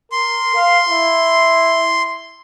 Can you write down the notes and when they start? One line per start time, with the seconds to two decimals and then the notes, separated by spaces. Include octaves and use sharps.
0.12 A#4 C6
0.56 F5
0.89 E4